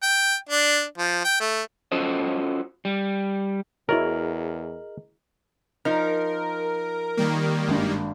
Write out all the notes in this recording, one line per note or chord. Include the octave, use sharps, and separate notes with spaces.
G5
D4
F3
G5
A3
C#4 F4 F#4 A4 C5 D#5
G3
E2 E4 F#4 G#4 A#4 C#5 D#5 F#7
F3 D#4 A#4
D#3 G3 A#3
G#1 G2